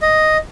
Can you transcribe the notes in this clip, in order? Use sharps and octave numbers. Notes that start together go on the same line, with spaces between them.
D#5